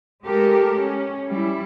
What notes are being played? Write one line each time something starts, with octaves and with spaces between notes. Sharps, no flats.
G#3 A3 G4 A4 A#4
C#4
G3 E4